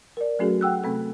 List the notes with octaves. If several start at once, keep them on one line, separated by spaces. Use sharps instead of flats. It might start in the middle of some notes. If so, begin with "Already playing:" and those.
A#4 D5
F#3 A3 C#4 F#4 G#4 A4
F#5 G5 E6 F#6
C3 A3 C4 A4